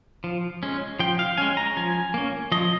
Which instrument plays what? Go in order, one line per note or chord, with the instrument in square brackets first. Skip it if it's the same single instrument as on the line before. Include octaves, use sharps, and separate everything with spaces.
[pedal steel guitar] F3
G#3 C#4
F3 G5
F5
G#3 C#4 G#5
A#5
F3 G#5
A#3 C#4
F3 D#5